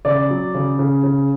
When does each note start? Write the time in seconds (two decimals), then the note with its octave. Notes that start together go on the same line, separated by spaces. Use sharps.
0.05 C#3 D5
0.30 F#3
0.54 C#3
0.79 C#3
1.03 C#3